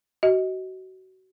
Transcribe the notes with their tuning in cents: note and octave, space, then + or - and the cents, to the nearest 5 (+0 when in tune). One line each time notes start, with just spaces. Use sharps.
F#4 +25 D#5 +20